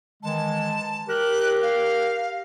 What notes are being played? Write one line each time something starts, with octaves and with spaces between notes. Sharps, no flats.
D#3 E3 G#3 A5
G4 A#4 F#6
F5